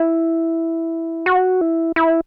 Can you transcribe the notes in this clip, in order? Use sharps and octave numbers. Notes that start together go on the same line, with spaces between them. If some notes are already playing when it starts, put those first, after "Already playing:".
Already playing: E4
F#4
E4
E4